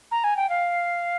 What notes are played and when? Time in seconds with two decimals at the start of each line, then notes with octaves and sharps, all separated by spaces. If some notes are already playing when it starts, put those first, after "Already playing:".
0.11 A#5
0.24 G#5
0.37 G5
0.49 F5